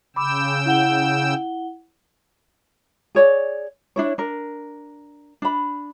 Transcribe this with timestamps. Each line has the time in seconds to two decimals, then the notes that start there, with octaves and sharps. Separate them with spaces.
0.16 C#3 G5 B5 D6 E6
0.66 E4 F#5 G7
3.15 G#4 C#5 D5
3.96 D4 E4 C#5
4.18 D4 A#4
5.42 D4 B5